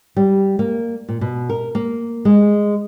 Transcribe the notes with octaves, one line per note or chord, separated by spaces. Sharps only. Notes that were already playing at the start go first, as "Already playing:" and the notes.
G3
A#3
A#2
B2
A#4
A#3
G#3